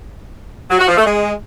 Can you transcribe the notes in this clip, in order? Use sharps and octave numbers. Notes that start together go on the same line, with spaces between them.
F#3
F#4
F3
A3
G#3